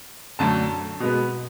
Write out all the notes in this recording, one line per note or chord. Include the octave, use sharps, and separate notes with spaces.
F#2 D3 A3 A5
B2 G#3 B3